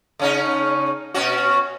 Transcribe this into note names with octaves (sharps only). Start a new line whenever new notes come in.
C#3 C#4 D#4
B2 C#4 F#4